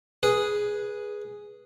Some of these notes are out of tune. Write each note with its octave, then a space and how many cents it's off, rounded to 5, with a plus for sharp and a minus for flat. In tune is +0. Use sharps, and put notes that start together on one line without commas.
G#4 +0 B4 -15